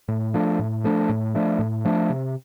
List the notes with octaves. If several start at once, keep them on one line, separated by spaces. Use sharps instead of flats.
A2
F3 A3 D4
A2
F3 A3 D4
A2
F3 A3 D4
A2
F3 A3 D4
C3